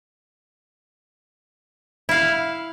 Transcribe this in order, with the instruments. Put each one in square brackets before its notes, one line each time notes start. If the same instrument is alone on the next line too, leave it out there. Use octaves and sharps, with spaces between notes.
[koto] E4 F5